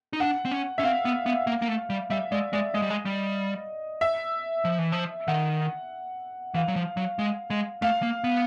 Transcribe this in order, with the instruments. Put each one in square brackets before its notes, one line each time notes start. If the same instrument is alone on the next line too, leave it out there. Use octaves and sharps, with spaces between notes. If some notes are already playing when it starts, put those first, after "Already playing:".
[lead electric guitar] D#4
[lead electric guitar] D4 [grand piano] F#5
[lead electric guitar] C4
C#4
[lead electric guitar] C#4 [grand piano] E5
[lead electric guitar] C4 [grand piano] F5
[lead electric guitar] B3
B3
A#3
A#3
A3
G3
[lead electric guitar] G3 [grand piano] E5
[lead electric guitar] G#3 [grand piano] D5
[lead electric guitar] G#3 [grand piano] D5
[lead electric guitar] G#3 [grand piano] D#5
[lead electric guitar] G3
G#3
G3
[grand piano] E5
[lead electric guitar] F3
E3
F3
[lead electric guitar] D#3 [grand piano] F#5
[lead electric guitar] E3 [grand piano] F5
[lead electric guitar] F#3
F3
F#3
G#3
G#3
[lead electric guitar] A3 [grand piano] F5
[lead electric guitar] A#3
B3